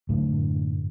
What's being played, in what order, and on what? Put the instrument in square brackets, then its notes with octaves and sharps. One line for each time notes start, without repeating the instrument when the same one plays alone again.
[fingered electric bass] F#2 A2 D3